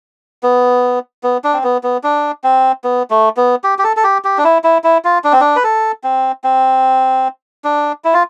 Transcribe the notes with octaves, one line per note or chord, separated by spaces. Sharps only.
B3
B3
D4
C4
B3
B3
D4
C4
B3
A3
B3
G4
G4
A4
A4
G4
G4
D4
E4
E4
E4
F4
D4
C4
D4
B4
A4
C4
C4
D4
E4
F4